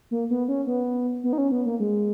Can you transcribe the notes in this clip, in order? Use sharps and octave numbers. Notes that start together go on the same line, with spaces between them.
A#3
B3
C#4
B3
B3
D#4
C#4
B3
A#3
G#3